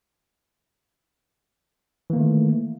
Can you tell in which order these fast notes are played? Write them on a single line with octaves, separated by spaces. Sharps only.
E3 A#3 D#3 A3